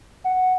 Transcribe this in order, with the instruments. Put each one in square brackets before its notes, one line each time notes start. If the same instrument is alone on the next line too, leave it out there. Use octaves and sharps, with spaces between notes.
[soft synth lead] F#5